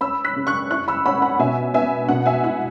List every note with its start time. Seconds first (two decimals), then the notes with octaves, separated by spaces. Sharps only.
0.01 C#4 B5 E6
0.25 F#6 B6
0.36 C#3
0.47 C#6 F#6
0.71 E4 C#6 F#6
0.88 B5 E6
1.06 C#4 F#5 B5
1.22 F#5 B5
1.39 B2 E5 G#5
1.74 B3 E5 G#5
2.09 B2 F#5
2.26 E5 G#5
2.44 E4 F#5